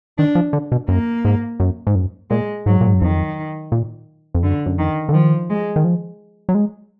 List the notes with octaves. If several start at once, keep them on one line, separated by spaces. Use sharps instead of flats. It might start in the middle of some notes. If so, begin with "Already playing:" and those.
D#3 D4
F3
D3
B2
F#2 A#3
G#2
F#2
G#2
F#2
A#2 G#3
G#2 F#3
A#2
G#2
F#2
F2 D#3
A#2
F2
F#2 D3
F#2
F2 D#3
D3
D#3 F3
G#3
D#3
F3
F#3
G#3